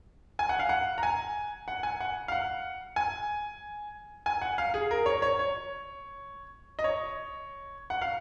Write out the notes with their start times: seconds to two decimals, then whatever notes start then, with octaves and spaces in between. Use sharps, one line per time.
0.39 G#5
0.49 F#5
0.59 F5
0.69 F#5
0.98 A#5
1.03 G#5
1.68 F#5
1.83 G#5
2.00 F#5
2.28 F5
2.32 F#5
2.96 G#5
4.26 G#5
4.42 F#5
4.58 F5
4.74 G#4
4.91 A#4
5.06 C#5
5.22 C#5
5.39 C#5
6.79 D#5
6.84 C#5
7.90 F#5
8.02 F5